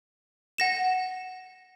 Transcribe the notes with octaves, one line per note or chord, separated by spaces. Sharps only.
F#5 A#6 E7